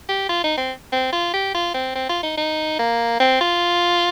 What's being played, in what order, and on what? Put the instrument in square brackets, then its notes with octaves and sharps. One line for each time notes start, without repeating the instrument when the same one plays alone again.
[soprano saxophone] G4
F4
D#4
C4
C4
F4
G4
F4
C4
C4
F4
D#4
D#4
A#3
C4
F4